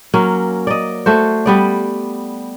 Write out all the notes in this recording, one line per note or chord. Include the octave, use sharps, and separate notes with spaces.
F#3 A#3 C#4
D5 D#5
A3 F#4 C5
G3 B3 D5